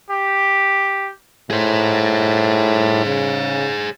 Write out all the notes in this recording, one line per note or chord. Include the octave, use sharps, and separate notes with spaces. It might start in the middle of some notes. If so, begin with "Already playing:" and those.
G4
A2 G#4 C5
C#3